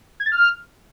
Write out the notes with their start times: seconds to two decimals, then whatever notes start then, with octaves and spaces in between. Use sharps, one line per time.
0.20 G#6
0.26 A6
0.32 F6